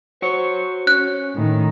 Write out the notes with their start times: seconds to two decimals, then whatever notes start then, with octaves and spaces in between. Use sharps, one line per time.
0.22 F#4 C5 C#5
0.87 C#4 F#6
1.35 A2 D#3